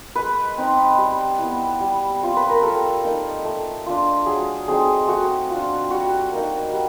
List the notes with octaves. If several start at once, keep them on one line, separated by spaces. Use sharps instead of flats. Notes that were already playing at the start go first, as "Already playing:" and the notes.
G#3 B4
C4 D#4
G3
B3 E4
G3
C4 F4
B4
A#4
G3 A4
A#3 D#4
A3
D4 F4
F#3 G#4
A3 C4 D#4 G#4
A3 F#4
D4 F4
G3 F#4
A#3 D#4
G3